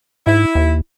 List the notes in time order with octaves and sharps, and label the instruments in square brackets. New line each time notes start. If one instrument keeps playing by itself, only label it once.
[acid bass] G#2 [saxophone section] E4
[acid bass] D#2